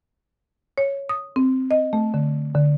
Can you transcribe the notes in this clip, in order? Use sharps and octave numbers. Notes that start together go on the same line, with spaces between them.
C#5
D#6
C4
D#5
A3
D3
D3